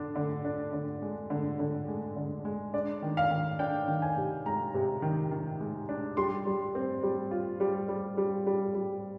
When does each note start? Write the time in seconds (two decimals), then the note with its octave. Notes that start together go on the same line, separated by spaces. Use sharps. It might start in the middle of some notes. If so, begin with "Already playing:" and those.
Already playing: D3 D4
0.16 D3
0.45 D4
0.73 D3
1.02 G#3
1.30 D3
1.59 D3
1.88 G#3
2.16 D3
2.45 G#3
2.73 D4 D5
3.02 D#3
3.17 F5
3.31 D#3
3.59 D4 G5
3.88 D#3
4.02 G#5
4.17 C3
4.46 G#3 A#5
4.74 C3
5.02 D#3
5.31 D#3
5.60 G#3
5.89 D4
6.17 G3 C6
6.46 G3
6.75 C4
7.03 G3
7.31 F4
7.60 G3
7.88 G3
8.17 G3
8.46 G3
8.74 G3